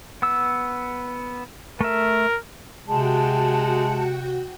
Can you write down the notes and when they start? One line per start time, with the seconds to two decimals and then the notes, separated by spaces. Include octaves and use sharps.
0.22 B3 E6
1.81 A3 A#4 E5
2.87 C3 G#3 F#4 F#5 G5 A5